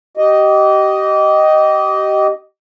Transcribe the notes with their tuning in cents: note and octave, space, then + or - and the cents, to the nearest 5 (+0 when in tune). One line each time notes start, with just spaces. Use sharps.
G4 -30 D#5 +0